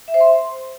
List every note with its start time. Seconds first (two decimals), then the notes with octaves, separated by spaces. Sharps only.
0.08 E5
0.14 C5
0.21 C6